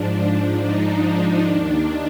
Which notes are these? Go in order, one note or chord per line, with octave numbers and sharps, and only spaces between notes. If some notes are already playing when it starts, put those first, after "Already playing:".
Already playing: G#2 F3 D4
D#4
D4
D#2 D#3